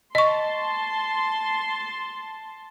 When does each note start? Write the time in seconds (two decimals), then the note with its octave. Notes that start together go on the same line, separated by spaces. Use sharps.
0.15 D#5 A5 C6 C#6